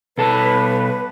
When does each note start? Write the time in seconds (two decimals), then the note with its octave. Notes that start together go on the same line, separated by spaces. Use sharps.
0.18 B2 A4 B4 A5